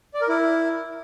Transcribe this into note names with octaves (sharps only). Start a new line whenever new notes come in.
D5
A#4
E4